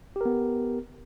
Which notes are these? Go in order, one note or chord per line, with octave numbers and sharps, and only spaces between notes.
B3 G4 A#4